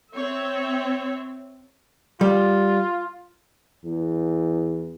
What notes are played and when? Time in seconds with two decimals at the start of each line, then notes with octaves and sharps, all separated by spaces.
0.14 C4 C#5 E5
2.21 G3 F4
3.85 E2